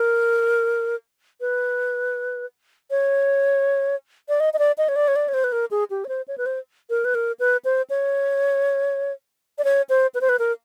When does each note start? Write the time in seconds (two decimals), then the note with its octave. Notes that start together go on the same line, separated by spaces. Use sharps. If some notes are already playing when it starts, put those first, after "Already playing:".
Already playing: A#4
1.41 B4
2.91 C#5
4.29 D5
4.40 D#5
4.53 D#5
4.59 D5
4.78 D#5
4.89 C#5
4.96 D5
5.08 C#5
5.16 D5
5.28 C#5
5.34 C5
5.44 B4
5.52 A#4
5.71 G#4
5.90 G4
6.05 C#5
6.09 C5
6.28 C#5
6.38 B4
6.46 C5
6.90 A#4
7.05 B4
7.15 A#4
7.40 B4
7.65 C5
7.90 C#5
9.58 D5
9.64 C#5
9.89 C5
10.14 B4
10.21 C5
10.29 B4
10.39 A#4